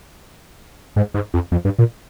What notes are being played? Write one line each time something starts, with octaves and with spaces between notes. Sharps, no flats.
G#2
G#2
F2
F2
G2
A#2